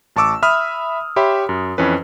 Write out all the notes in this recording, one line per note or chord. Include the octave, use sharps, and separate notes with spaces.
A1 A5 C#6 D6 E6
E5 B5 D#6 F6
G4 C#5 E5 B5 C6
F#2
F2 E3 C#4 B4